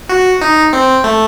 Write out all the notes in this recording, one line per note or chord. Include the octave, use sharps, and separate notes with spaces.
F#4
D#4
C4
A3